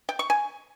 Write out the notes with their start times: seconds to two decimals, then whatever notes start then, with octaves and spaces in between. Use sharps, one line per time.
0.09 G5
0.19 C#6
0.30 G#5